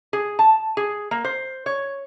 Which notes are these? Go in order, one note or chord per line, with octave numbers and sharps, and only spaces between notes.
G#4
A5
G#4
A#3
C5
C#5